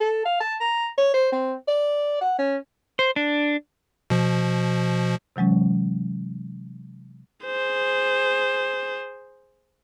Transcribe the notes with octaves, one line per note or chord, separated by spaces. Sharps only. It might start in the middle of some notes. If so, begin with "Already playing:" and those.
A4
F5
A5
A#5
C#5
C5
C4
D5
F#5
C#4
C5
D4
B2 F3
C3 E3 F#3 G#3 C#4
G#4 C5